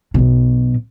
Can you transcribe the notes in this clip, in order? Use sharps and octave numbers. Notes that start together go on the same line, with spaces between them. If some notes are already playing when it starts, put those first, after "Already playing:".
B1 B2